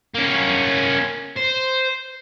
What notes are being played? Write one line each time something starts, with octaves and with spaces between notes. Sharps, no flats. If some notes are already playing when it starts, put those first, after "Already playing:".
A#3 C#4
C5